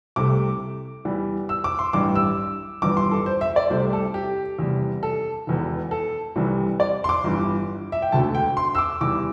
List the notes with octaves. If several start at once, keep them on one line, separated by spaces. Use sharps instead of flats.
C2 C3 A3 D6
E2 E3 G3
E6
D6
C6
A1 G2 G3 D6
E6
G1 G2 E3 G3 D6
C6
A4
C5
E5
D5
C2 C3 A3 C5
A4
G4
E2 C3 G3
A4
E1 E2 E3
A4
C2 C3 E3 G3
D5
C6
D6
G1 G2 E3
E5
G5
E1 D2 D3 A3 A5
G5
C6
E6
D6
E2 E3 G3 D6